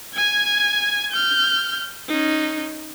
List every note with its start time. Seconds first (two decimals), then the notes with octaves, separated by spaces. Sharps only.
0.14 G#5 G#6
1.12 F6 G6
2.08 C#4 D#4